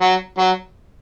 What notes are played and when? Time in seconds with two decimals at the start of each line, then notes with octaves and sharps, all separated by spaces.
0.01 F#3
0.38 F#3